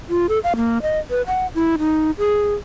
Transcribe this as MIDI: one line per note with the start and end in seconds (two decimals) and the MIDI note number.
0.10 0.27 65
0.29 0.39 69
0.44 0.53 77
0.56 0.82 58
0.82 0.99 75
1.10 1.22 71
1.27 1.47 78
1.55 1.76 64
1.79 2.11 63
2.18 2.55 68